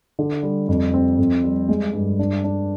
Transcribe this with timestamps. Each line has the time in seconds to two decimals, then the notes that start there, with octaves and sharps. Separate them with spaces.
0.19 D3
0.43 G3
0.68 F2
0.94 C4
1.18 F2
1.44 G3
1.69 G#3
1.93 G2
2.19 D4
2.44 D4